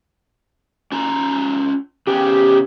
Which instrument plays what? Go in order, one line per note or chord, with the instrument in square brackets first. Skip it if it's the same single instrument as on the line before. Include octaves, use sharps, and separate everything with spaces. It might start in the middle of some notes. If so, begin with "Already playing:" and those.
[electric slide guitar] C#4 F4 A#5
[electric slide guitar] C#3 B3 C#4 [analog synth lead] G4